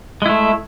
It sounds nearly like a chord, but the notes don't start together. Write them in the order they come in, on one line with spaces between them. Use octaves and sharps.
G#3 E4 A3